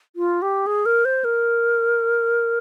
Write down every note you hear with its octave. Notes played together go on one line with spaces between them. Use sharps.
F4
G4
G#4
A#4
C5
A#4